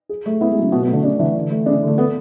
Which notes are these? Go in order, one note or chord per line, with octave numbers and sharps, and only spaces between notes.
G#4
A3
B3 E4
G#3
F#3
C#3
B2 F#4
B2
A3
D3
C#3 D4
D3 E3
D3
A3
C#3 D4
D3 A3
B3 A4